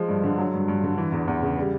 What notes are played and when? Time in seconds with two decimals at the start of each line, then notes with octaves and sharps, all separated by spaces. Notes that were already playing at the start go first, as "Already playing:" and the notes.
Already playing: F3 G#3
0.09 G2
0.24 D3
0.38 F#3
0.54 G2
0.68 G2
0.83 D3
0.98 E3
1.12 E2
1.28 E2
1.42 C#3
1.58 G3